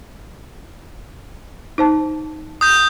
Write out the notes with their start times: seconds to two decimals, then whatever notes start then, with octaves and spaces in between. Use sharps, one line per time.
1.78 D#4 C5 A5
2.61 D#6 G6